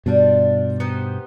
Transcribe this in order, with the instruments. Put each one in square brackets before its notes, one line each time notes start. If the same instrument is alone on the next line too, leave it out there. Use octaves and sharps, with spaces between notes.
[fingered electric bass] G2 B2 [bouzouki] G3 D4 F4
[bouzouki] B3 D#4 G4 C5